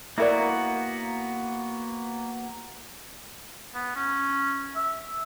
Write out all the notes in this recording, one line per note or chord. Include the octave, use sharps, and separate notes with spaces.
A#3 B3 E4 F#4 A#4 D5
B3
C#4
E5